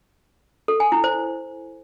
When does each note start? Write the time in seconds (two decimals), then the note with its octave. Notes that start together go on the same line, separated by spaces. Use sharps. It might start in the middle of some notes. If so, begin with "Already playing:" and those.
0.68 A4
0.80 G#5
0.92 E4
1.04 C5